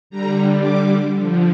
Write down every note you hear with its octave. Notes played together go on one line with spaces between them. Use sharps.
D3 G3 A#5
D6
D3 F3